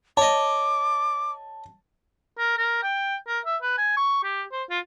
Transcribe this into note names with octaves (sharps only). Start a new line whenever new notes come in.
C#5 D#5 A5 D6
A#4
A#4
G5
A#4
E5
B4
G#5
C#6
G4
C5
F4